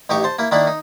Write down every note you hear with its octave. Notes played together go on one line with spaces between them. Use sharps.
A1 D#4 G4 C#6 D6
C5 A5
A#3 E4
D#3 A#3 D4 E4 A5 B5
D#4